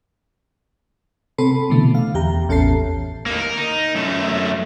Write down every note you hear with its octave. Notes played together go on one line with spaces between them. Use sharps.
C3 C4 A4 B5
B2 D3 E3 A3
F5
E2 G4 A#5
A1 E2 C#4 A4 A5 C7
A#3 D#4
A#4
D#4
F#2 A3